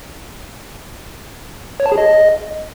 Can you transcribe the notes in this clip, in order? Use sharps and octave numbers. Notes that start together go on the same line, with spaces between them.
C#5
A5
G#4
D#5